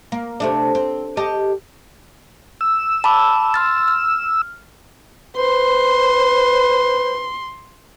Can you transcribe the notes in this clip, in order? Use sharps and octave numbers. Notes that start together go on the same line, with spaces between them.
A#3
C3 A3 D4
C4
G4 A4 D#5
E6
A5 B5 D6
C6 F6 A6
F6
B4 C5 C6